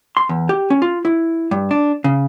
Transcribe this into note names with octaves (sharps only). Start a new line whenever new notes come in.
C6
E2
G4
C#4
F4
E4
G2
D4
C#3